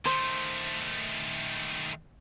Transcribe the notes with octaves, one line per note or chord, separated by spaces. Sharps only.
D#3 A3 C5